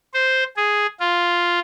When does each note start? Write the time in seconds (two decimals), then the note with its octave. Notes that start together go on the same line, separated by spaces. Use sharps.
0.14 C5
0.57 G#4
1.00 F4